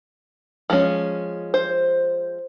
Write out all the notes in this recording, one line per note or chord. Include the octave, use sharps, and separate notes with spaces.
F3 G#3 C#4
C5